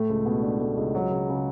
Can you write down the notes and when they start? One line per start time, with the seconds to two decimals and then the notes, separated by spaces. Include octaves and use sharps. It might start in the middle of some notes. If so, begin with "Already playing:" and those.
Already playing: A2 A3
0.10 C#2
0.25 B2
0.43 D4
0.60 A3
0.77 C#2
0.95 F#3
1.11 C#2
1.29 C#3